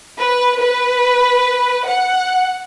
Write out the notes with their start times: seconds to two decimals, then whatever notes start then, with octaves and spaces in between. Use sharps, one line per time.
0.18 B4
0.59 B4
1.89 F#5